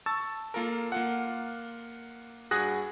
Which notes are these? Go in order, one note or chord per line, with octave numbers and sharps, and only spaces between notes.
A5 C#6 E6 A6
A#3 F4 A4 A#4
A#3 F4 F#5
G2 F#4 G#4 D#6 F#6 A#6